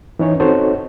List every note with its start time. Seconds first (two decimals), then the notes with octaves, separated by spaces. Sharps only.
0.19 E3 C#4 D#4 C#5
0.40 C4 D#4 F#4 A4 C5 C#5